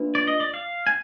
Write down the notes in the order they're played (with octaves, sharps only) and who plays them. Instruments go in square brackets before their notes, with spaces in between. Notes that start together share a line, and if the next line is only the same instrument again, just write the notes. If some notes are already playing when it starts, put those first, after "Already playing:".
Already playing: [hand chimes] A#3 D4 F4 B4
[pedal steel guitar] D5
D#5
D5
F5
G#5